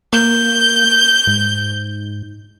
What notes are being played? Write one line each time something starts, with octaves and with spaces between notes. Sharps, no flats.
A#3 G6
G#2